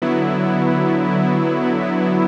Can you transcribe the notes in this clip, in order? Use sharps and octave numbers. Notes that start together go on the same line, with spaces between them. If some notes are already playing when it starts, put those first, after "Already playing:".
D3 F#3 B3 E4